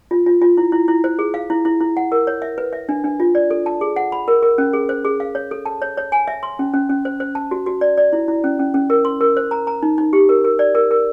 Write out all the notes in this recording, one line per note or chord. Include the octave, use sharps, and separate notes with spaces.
F4
F4
F4
E4
E4
E4
C5
G#4
F5
E4
E4
E4
F#5
A#4
C#5
E5
B4
E5
D4
D4
F4
D5
A4
A5
G#4
F#5
B5
A#4
A#4
C#4
G#4
C5
G#4
F5
C#5
A4
A5
C#5
C#5
G#5
E5
C6
C#4
C#4
C#4
C5
C5
A5
F#4
F#4
D5
D5
E4
E4
C#4
C#4
C#4
A#4
C6
A#4
C5
A#5
A#5
D#4
D#4
G4
A#4
A#4
D5
A#4
A#4